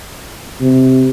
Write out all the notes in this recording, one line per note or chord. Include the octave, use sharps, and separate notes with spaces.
C3